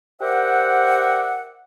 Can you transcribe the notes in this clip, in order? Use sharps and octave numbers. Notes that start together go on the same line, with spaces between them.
G4 A#4 C5 D5 E5 F#5